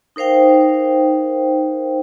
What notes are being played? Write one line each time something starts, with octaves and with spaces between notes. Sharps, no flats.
D#4 A#4 C5 F5 G5